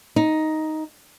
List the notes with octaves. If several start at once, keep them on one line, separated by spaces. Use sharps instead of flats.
D#4